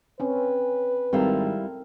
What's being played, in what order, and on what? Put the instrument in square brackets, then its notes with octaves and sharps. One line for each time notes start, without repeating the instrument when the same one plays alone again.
[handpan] C4 C#4 [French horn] B4
[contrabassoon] G#1 [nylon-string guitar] G3 E4 F5 [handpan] C4 A4 A#4